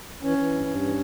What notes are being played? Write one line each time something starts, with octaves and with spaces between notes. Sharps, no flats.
E3 C#4
E3
G2
G2
E3